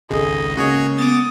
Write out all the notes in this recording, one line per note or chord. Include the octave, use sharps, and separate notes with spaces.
G#1 C#2 G#4 A4 D#5
C#3 G#3 A#3 F#4 G#4 C#5
B3 D6 D#6 A6